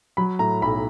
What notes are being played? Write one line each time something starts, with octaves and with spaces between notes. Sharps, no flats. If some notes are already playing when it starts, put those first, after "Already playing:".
F#3 B5
A2 A#5
B1 B5